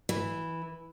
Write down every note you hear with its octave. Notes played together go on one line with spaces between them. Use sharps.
E3